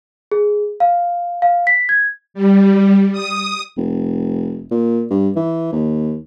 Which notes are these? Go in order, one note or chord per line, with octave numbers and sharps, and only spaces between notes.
G#4
F5
F5
B6
G#6
G3
D#6
F1
A#2
G2
E3
D#2